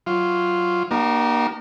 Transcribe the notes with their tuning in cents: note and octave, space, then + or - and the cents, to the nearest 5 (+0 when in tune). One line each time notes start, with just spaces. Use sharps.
F#3 +0 F4 +0
A#3 +30 D#4 -40 G4 -30